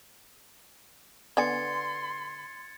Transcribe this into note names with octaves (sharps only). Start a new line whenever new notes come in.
D3 B3 G#5 C6 G#6 A6 C#7